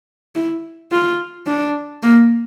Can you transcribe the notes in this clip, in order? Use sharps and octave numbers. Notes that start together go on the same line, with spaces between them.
E4
F4
D4
A#3